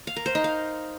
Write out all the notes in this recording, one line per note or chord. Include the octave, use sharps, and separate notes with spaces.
F5
A#4
C5
D#4
F5